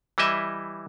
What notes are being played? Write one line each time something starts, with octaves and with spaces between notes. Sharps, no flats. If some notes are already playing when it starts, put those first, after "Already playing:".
E3 G3 E4 D#5 E5